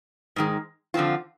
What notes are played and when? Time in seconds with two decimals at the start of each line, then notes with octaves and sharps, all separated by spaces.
0.36 G#2 D#3 G#3
0.94 D3 F3 C4 F4